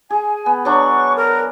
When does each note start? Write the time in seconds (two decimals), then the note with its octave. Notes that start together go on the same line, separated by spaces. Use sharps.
0.10 G#4 G#5
0.46 B3
0.65 F#3 D4 C#6
1.15 A#4